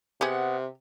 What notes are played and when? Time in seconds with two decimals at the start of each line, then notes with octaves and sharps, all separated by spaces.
0.21 C3 B3 G4 G#4 F#5